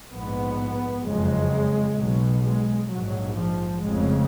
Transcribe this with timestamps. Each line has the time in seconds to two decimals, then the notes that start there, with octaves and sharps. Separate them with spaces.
0.10 A#1 G#2 B3
1.03 F#1 F2 C#3 G#3
1.97 B1 B2 F#3
2.43 G#3
2.89 A#1 G#2 F#3
3.36 F3
3.82 F1 F2 C#3 G#3